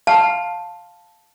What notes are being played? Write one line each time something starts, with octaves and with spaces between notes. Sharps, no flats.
F5 A5